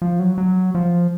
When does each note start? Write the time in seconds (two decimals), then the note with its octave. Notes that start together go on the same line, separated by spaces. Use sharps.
0.02 F3
0.19 F#3
0.38 F#3
0.75 F3